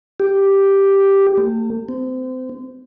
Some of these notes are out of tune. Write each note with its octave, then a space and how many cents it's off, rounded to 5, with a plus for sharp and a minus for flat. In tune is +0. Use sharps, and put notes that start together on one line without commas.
G4 +0
A3 +45
C4 -30